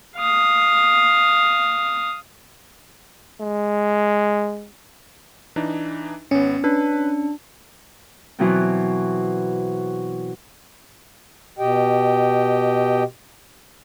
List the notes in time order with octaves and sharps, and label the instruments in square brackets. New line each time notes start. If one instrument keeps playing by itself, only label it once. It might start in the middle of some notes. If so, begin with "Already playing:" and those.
[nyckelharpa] F5 D#6
[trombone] G#3
[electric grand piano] E3 D4 D#4
[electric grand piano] G#1 B3 [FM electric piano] C#4
[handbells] D4 [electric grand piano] B4
[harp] B2 E3 F#3 B3 C4
[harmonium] B2 G4 D#5 G5